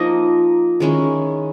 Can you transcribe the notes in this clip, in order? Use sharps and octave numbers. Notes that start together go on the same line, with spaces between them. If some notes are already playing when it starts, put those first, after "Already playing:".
Already playing: F3 A#3 D#4 D#5
D#3 G#3 C#4 E4